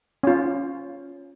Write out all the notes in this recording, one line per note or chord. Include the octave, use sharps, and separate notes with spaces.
C#4 F4